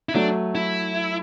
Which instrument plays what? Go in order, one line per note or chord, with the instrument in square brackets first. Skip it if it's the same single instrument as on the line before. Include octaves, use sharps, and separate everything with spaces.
[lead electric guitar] E4
[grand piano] F#3 A3 [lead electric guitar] D4
[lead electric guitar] E4